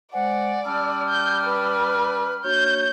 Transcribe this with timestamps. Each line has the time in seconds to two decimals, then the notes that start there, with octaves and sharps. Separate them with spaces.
0.13 G#3 C5 D5 F#5 G#5
0.65 G3 C#4 A5 E6 F6
1.08 G6
1.45 B4
2.44 A#3 D4 F#4 C#5 G6